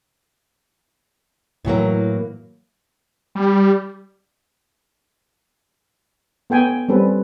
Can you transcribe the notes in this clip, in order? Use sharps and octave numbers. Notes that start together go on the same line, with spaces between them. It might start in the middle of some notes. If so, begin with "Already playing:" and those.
A2 E3 F#3 A#3
G3
B3 A4 G5 G#5
G3 C4 C#4 A4 B4